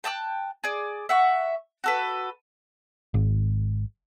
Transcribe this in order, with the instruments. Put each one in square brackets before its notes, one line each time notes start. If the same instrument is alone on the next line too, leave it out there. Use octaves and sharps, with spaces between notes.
[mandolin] G5 A5 D6 F#6
G#4 D5
E5 F#5 C#6
F#4 A4 B4
[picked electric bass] G#1